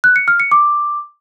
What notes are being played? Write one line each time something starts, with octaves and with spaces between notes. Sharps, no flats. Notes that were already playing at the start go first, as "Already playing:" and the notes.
F#6
C#7
F6
C#7
D6